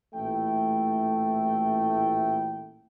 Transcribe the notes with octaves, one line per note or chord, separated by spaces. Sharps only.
A1 A#2 A3 E4 G5